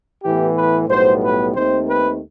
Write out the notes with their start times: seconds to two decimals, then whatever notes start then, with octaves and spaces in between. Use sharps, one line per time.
0.23 A2 E3 B3 G4
0.56 B4
0.89 B1 A2 G3 B3 C5
1.22 B4
1.54 D#2 D#3 A3 C4 C5
1.87 B4